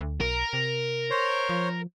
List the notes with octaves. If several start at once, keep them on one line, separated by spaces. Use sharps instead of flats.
D2
B1 A#4
C3
C5 C#5 C6
F3